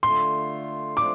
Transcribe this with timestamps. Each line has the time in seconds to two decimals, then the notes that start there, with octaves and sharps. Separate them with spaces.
0.03 D3 A3 F4 C6
0.97 F3 A3 D4 F4 D6